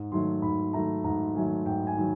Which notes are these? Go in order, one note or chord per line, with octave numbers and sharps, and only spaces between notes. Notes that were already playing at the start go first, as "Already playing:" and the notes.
Already playing: G#2
D#3 F#3 A3 C6
G#2 B5
D#3 F#3 A3 A#5
G#2 A#5
D#3 F#3 A3 G#5
G#2 G5
G#5
D#3 F#3